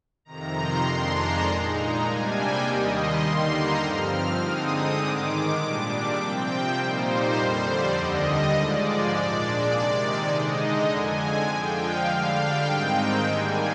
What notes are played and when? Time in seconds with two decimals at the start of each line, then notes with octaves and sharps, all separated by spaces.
0.25 F2 C3 D#3 A#5
0.55 C6
0.84 F2 D#3 G#3 D4
1.14 A#5
1.43 A#2 G#3 D#4
1.73 A#5
2.03 C3 G3 A#3 D4 G#5
2.32 G5
2.61 D#2 D#3 G3 D#5
2.92 C6
3.20 D3 G3 A#3 D#4
3.50 A#5
3.80 G2 F3 C4 F6
4.09 F6
4.39 D3 G#3 C4 D#4 D#6
4.97 G#2 D#3 G#3 D6
5.57 A#2 G3 D4
6.16 C3 F3 C4 G5
6.75 A#2 G3 A#3 D#4 C5
7.34 F2 D3 G3
7.64 D5
7.93 D#2 D3 G3 D#5
8.52 G#2 F3 G#3 D5
9.11 A#2 G#3 D4 D5
9.70 C3 D#3 G#3 D5
10.00 D5
10.30 D3 G#3 D#4 D#5
10.89 F2 D3 G#3 G#5
11.47 D3 F3 G#3 G5
11.78 F5
12.07 D3 G3 D4
12.37 G5
12.66 G#2 D#3 G#3 C4 D#4
13.25 G#2 G3 A#3 D4 G#5